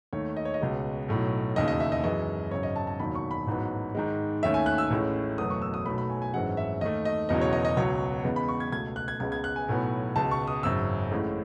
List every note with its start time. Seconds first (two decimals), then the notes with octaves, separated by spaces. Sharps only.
0.13 D#2 D#3 A3 C#5
0.37 D#5
0.45 C#5
0.54 D#5
0.61 C#2 B2 G#3 C#4
1.08 B1 A2 F#3
1.56 E1 D#2 C#3 D#5
1.68 D#5
1.80 E5
1.92 D#5
2.03 F#2 E3 G#3 D#5
2.51 G#1 F#2 C#3 F#3 C#5
2.63 D#5
2.76 A5
2.87 A5
2.99 E1 D#2 D#3 F#3 B5
3.15 C#6
3.31 B5
3.47 A1 G#2 F#3 B3
3.95 G#2 D#3 G#3
4.43 D#2 D#3 A3 C#4 E5
4.54 G#5
4.66 F#6
4.78 E6
4.90 A1 A2 G#3 C#4
5.38 F#1 E2 B2 F#3 A3 D#6
5.50 C#6
5.62 E6
5.74 D#6
5.86 B1 B2 F#3 A3 B5
5.98 B5
6.10 G#5
6.22 G#5
6.34 G#1 F#2 E3 G#3 C#4 F#5
6.57 E5
6.81 D#2 D#3 A3 D#5
7.05 D#5
7.29 E1 E2 C#3 F#3 D#5
7.41 C#5
7.53 D#5
7.65 D#5
7.77 C#2 B2 F#3 C#5
8.24 E2 C#3 G#3 B3
8.36 B5
8.48 C#6
8.60 G#6
8.72 C#2 B2 A3 G#6
8.96 F#6
9.08 G#6
9.20 C#2 C#3 G#3 B3 G#6
9.32 G#6
9.44 F#6
9.56 G#5
9.68 B1 A2 F#3 B3
10.16 C#2 B2 G#3 A5
10.31 C#6
10.47 D#6
10.63 G#1 F#2 C#3 E6
11.11 A1 A2 G#3 C#4